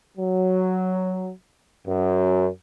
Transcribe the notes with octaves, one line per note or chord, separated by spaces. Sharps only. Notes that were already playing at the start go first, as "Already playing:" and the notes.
F#3
F#2